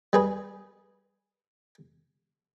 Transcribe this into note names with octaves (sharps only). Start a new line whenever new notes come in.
G3 G#4 B4